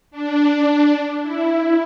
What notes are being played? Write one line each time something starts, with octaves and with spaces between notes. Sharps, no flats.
D4
E4